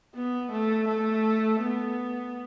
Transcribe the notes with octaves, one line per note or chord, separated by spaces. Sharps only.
B3
A3
A3
B3